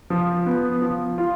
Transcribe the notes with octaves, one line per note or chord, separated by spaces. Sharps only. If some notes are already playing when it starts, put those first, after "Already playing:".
F3
B3
F3
F4